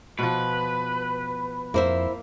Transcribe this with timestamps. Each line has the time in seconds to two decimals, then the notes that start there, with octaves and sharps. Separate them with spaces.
0.19 B2 F3 B4
1.74 F2 A#3 E4 C5 E5